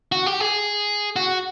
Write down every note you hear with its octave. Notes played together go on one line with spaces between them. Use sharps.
F#4
G4
G#4
F#4